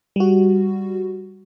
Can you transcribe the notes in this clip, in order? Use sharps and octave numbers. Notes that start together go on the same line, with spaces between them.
G3 F#4